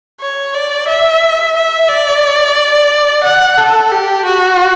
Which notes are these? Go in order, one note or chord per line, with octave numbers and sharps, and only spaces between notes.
C#5
D5
E5
E5
D5
F#5
A4
G4
F#4